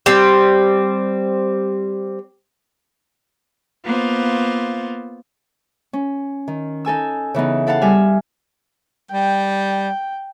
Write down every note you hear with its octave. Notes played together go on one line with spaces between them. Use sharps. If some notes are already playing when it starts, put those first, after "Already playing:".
G3 C4
A#3 B3 F4 C5
C#4
D#3
D#4 A4 G#5 E6
C#3 E3 B3 D#4
E4 A4 F5 F#5 A5
G3 E5 G#5 F6
G3 G5